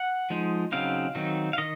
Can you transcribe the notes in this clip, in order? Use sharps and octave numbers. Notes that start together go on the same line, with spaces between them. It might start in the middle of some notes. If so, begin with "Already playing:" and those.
Already playing: F#5
F3 G#3 D#4
C#3 F#3 C4 D#4 F5
D#3 F#3 C4 D#4
F5
D#3 D#5